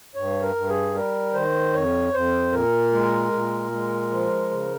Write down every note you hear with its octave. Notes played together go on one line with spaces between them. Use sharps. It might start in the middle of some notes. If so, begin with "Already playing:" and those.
G2 C#5
A#4
G2
G#4
G3 A#4
D#3 C5
F2 C#5
F2 C5
A#2 A#4
G#3
A#2
G#3
F3
C#3